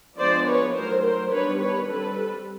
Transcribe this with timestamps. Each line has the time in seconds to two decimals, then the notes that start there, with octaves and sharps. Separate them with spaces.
0.19 F3 G#3 B3 D4 C5 D5
0.47 B4 C#5
0.75 D#3 F#3 A3 A#4 C5
1.04 A#4 C5
1.31 D#3 G3 B3 D4 B4 C#5
1.60 B4 C#5
1.88 G3 C4 A4 B4